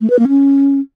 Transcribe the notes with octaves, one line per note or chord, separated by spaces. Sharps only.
A3
B4
A#3
C#4